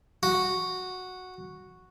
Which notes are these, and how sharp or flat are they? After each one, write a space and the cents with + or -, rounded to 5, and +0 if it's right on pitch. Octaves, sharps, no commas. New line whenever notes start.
F#4 -5